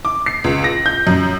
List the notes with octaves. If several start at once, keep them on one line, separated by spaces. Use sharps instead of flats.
D6
C7
C#2
A#6
G6
F#2